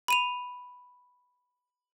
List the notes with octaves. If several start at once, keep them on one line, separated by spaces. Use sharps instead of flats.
B5 D#7 F7